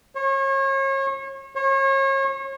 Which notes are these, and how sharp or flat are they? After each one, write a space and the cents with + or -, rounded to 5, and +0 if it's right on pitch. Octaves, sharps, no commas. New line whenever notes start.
C#5 -35
C#5 -35